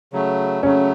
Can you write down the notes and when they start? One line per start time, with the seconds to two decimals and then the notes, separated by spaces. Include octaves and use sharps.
0.13 C#3 F#3 A3
0.63 C#3 F#3 A3 C#4